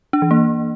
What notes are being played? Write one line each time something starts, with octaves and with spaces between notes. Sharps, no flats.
D4
E3
A#3